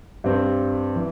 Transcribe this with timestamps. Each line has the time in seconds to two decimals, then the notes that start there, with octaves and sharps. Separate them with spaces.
0.24 G2 G3 C4
0.96 E3